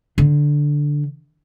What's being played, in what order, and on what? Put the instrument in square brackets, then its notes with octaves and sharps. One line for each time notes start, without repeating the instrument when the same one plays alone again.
[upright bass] D3